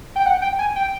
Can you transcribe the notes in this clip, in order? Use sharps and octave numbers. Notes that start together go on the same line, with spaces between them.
G5
F#5
G5
G#5
G5